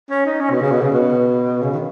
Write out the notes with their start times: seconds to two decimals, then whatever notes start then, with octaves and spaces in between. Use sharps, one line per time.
0.10 C#4
0.26 D#4
0.41 C#4
0.51 B2
0.61 C#3
0.72 B2
0.81 C#3
0.92 B2
1.63 C#3
1.73 D#3